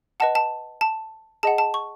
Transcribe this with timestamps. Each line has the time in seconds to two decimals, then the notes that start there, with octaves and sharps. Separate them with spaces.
0.20 B4 D#5 F#5 A5
0.35 A5
0.81 A5
1.43 G#4 D#5 F#5 A5
1.58 A5
1.74 C#6